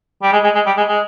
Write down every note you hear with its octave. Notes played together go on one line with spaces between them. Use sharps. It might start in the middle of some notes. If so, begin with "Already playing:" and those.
G3
G#3
G#3
G#3
G3
G#3
G#3